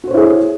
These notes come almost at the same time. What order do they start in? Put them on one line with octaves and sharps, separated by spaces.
F#4 C5 C#5 E4 G#4